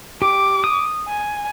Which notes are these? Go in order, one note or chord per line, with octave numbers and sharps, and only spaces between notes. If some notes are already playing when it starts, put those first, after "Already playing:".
G4 D6
D#6
G#5